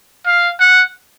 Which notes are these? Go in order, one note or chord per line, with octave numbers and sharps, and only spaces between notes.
F5
F#5